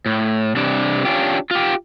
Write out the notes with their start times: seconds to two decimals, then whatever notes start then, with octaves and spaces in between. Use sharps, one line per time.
0.06 A2
0.56 C3 G3 D4
1.05 C#4 D4 F4 G4
1.51 F4 G4